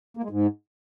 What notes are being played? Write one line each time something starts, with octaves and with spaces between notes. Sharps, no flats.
A#3
G#3
G#2